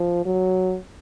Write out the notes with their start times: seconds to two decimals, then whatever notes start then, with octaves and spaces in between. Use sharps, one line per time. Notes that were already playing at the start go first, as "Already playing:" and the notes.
Already playing: F3
0.26 F#3